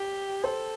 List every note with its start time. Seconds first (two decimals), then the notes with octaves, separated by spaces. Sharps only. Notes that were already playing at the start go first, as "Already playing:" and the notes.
Already playing: G4
0.44 A4 C5